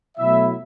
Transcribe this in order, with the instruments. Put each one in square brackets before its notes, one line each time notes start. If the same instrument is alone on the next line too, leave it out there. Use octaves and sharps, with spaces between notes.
[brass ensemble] B2 F#3 A3 E4 E5